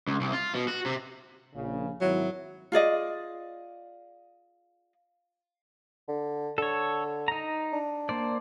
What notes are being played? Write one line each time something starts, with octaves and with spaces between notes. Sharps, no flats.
C#2
C2
F4
B2
F#4
C3
A#1 C#3
G#1 F#3 E4
F4 G#4 D5 D#5
D3
D3 A4 C#5
D#4 A#5
D4
A#3 C5 D5